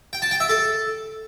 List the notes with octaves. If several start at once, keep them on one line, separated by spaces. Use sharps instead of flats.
G5
A5
G5
E5
A4